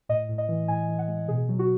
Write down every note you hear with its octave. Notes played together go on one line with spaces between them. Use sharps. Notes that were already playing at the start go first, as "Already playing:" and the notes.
A2 D#5
A2
D#5
E3
A2 G#5
E3
F#5
G#3
B2 G#4
F#3
F#4